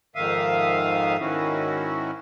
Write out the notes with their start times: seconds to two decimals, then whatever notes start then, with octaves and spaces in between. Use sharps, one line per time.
0.16 F2 G#2 D#3 E5 F5 D#6
1.21 G#2 D#3 C#4 E4 F#4